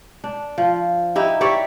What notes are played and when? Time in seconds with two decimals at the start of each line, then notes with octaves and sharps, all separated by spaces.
0.24 D4
0.58 F3
1.16 D#4 E4 G4
1.41 G4 C#5 D5 E5